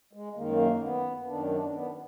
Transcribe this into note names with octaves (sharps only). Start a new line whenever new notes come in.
G#3
F#2 D#3 A#3
G#3
A#3
B3
F#2 D#3 D4
D4
B3